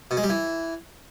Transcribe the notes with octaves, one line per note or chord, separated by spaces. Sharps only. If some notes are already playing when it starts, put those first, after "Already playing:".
B2
G#3
G3
E3